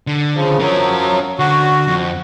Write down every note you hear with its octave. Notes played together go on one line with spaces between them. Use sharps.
D3
C#3 F3
F3 F#3 C#4 A#4
D3 F#4
F2